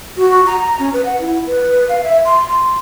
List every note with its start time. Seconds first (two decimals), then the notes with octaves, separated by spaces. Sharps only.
0.17 F#4
0.46 A#5
0.79 C#4
0.93 B4
1.05 F#5
1.20 E4
1.46 B4
1.89 F5
2.03 E5
2.25 C6
2.48 C6